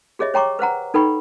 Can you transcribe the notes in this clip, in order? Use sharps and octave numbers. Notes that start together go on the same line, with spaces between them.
G4 G#4 C#5 D#5 E5
C#5 G5 A#5 C#6 D6
B4 C5 F#5 A#5
D#4 A4 B4 G5 B5 C#6